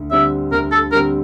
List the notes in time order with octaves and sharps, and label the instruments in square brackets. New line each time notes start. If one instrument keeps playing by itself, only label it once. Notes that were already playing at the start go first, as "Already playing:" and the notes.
Already playing: [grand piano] D2
[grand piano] D3 G3 C4 [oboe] E5
[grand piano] D2 [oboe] A#4
[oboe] A4
[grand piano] D3 G3 C4 [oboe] A#4